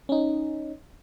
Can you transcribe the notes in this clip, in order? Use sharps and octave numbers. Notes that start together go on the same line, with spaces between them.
C#4 D#4